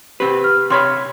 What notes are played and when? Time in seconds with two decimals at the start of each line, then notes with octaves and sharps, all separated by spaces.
0.20 C3 C4 G4 B4
0.44 F6
0.70 C3 C#5 B5 C6